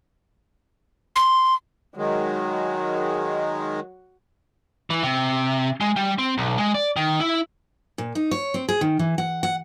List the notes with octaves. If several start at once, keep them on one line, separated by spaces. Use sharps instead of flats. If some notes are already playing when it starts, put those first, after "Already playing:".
C6
D#3 F#3 G#3
E3
C3
G#3
G3
C4
B1
G#3
D5
D#3
E4
A#2
D#4
C#5
C4
G#4
D#3
E3
F#5
F#5